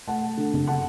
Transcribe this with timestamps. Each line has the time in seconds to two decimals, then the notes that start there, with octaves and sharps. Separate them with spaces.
0.07 A3 F#5 A5
0.23 A3
0.37 D3
0.53 F#1
0.67 F#5 A5